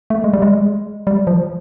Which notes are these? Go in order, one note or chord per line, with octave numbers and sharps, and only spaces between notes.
A3
G#3
G3
G#3
G3
F3